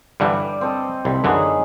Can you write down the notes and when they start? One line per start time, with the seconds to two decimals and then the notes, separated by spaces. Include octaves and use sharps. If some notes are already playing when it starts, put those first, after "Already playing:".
0.20 G2 D3 E3 G3 D5
0.61 C4 A4 D#5
1.05 C2 B5
1.24 F#2 D3 E3 C#4 D#4 G#4